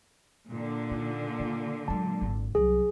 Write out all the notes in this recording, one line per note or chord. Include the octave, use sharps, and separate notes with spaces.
A#2 D3
D#4
F4
F#3 G#3 A5
G#1
C2 F#3 G#4